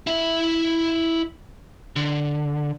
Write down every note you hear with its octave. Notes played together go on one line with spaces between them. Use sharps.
E4 E5
D3